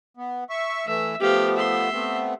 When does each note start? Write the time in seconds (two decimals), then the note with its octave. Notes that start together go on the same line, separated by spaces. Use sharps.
0.17 B3
0.50 E5 C#6
0.87 E3 A3 E5
1.21 F3 A3 B3 G4 F5
1.56 E5 C6
1.93 A3 B3 C4